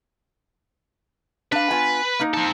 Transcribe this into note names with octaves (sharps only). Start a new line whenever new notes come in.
D4 B4 F5
B3 F4 G#5
A#3 D#4
C4 A4